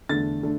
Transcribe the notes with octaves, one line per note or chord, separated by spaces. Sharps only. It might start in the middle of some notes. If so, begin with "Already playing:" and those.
E2 D3 A3 D4 A6
D3 A3 D4